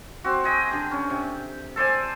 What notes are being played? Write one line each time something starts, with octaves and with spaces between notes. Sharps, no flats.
C4 F#4
G#4 D#5 G5
D3 G4
C#4
C3
A4 C5 D5 G#5